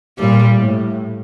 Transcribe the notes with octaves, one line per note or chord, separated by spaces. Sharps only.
A#2 G3
A2